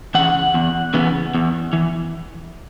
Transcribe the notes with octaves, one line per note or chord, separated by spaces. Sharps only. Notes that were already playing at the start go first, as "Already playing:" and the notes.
C#3 E3 F#5
E2
C#3 E3 B3
E2
E3